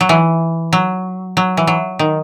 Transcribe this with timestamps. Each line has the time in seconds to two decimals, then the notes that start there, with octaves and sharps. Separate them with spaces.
0.01 F#3
0.09 E3
0.73 F#3
1.37 F#3
1.57 E3
1.67 F#3
1.99 D#3